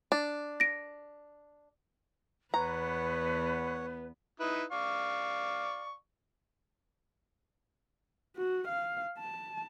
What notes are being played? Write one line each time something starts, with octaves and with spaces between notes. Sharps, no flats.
D4
A#6 D7
E2 B3 B4 C#5 F#5 A#5
D#4 E4 B4
D5 F5 C#6
F#4
F5
A5